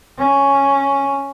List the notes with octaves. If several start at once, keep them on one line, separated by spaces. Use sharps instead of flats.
C#4